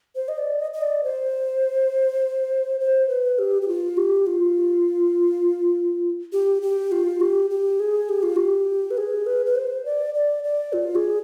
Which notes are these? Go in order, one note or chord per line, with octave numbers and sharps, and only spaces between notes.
C5
D#5
D5
D#5
D#5
D5
C5
C5
B4
G4
G4
F4
G4
F4
G4
G4
F4
G4
G4
G#4
G4
F4
G4
B4
G#4
B4
B4
C5
D5
D5
D5
F4
G#4